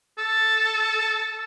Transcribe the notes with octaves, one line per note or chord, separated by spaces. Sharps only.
A4